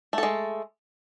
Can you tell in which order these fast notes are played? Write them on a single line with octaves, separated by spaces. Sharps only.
A3 A4 G#3